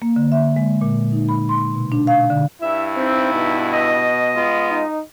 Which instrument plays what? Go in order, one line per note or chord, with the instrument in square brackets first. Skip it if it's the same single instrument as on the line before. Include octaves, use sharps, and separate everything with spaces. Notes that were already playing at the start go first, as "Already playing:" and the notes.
[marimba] A#3
D3
E5
G#3
A#2
D#4
B5
C6
B2
D4
F5
D3
[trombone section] G2 E4 [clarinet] E5
[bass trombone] C4 [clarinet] D#4
[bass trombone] B2
[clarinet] D#5
[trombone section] G#3 B3 F4
[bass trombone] D#4